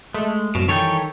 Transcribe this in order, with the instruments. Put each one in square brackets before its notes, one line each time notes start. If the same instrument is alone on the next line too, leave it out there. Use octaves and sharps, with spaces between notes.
[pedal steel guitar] G#3 [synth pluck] A3
[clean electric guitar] C2 B2 [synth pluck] F#2
[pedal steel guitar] D#3 A4 G5 [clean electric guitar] E3 G3 C#5